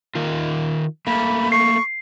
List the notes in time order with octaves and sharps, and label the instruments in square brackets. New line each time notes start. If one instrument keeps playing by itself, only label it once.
[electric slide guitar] D#3 F4
[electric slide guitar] A3 A#3 [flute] B5
[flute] C#6 [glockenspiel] C7